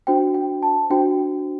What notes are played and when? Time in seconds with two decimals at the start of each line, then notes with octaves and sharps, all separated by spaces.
0.07 D4 F#4 C5 G5
0.34 G5
0.63 A5
0.90 D4 F#4 C5 G5